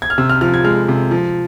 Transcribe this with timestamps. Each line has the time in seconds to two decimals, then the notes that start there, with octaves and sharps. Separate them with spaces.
0.02 G#6
0.10 F6
0.18 C3 E6
0.30 F6
0.41 F3 F6
0.54 G#6
0.64 G#3 F6
0.88 C3
1.11 F3